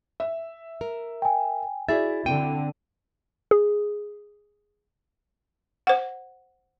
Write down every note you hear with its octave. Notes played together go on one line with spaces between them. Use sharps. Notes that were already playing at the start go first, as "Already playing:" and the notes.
E5
A#4
G5 G#5
E4 F#4 G#4 D5 E5 A6
D3 C4 G5 D#7
G#4
C5 F#5